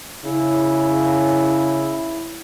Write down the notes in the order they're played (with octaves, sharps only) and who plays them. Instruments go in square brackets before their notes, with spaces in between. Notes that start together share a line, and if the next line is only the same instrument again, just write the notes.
[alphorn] C#3 [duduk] E4